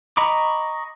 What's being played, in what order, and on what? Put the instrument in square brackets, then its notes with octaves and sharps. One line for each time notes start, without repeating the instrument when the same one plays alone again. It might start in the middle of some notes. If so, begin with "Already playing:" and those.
[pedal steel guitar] D#5 A#5 B5 C#6 D6